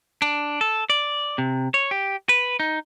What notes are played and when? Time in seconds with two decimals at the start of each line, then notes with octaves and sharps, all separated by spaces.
0.22 D4
0.61 A4
0.90 D5
1.38 C3
1.74 C#5
1.91 G4
2.29 B4
2.60 D#4